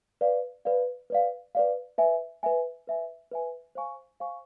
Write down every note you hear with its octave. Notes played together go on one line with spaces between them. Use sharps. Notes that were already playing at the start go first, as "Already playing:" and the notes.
B4 D5 F5
B4 D5 F5
B4 D5 F5
B4 D5 F5
B4 E5 G#5
B4 E5 G#5
B4 E5 G#5
B4 E5 G#5
C5 F5 G#5 C#6
C5 F5 G#5 C#6